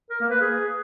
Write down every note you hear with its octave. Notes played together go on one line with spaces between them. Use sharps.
A#4
A#3
B4
G#4